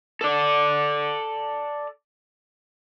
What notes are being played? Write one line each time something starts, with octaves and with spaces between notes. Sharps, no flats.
A4 D5